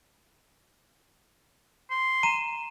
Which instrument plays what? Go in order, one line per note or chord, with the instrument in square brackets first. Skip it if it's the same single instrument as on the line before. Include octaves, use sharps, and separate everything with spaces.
[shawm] C6
[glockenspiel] A#5 D#7 E7